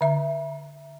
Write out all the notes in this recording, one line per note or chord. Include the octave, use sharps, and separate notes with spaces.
D3 E5 A#5